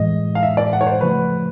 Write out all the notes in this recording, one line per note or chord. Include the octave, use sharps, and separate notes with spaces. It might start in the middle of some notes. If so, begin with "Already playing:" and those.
Already playing: A2 E3 G#3 D#5
F5
E5
D5
F#5
C#5
C5
C#3 F3 A3 B4